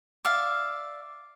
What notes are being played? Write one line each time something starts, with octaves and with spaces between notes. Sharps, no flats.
D5 E5 F5